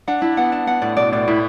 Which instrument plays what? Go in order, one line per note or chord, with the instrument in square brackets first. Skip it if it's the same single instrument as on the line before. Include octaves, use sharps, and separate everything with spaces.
[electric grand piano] D4 [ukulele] F#5
[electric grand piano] D4 [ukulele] E4
[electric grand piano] B3 [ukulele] F#5
[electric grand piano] D4 [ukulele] A5
[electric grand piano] B3 [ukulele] F#5
[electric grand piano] A2 [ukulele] D5
[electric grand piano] B2 [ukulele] D5
[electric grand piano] A2 [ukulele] D5
[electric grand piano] A2 [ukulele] E4